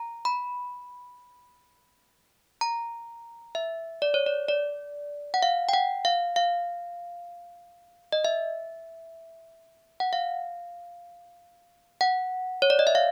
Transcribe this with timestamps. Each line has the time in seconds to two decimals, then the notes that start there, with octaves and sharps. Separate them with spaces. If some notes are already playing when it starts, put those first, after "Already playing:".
Already playing: A#5
0.25 B5
2.61 A#5
3.55 E5
4.02 D5
4.14 C#5
4.26 D5
4.49 D5
5.34 F#5
5.43 F5
5.69 G5
5.73 F#5
6.05 F5
6.36 F5
8.12 D#5
8.25 E5
10.00 F#5
10.13 F5
12.01 F#5
12.62 C#5
12.70 D5
12.79 D#5
12.87 E5
12.95 F5